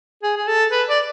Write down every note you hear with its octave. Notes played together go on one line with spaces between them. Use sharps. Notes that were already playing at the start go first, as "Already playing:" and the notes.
G#4
G#4
A4
B4
D5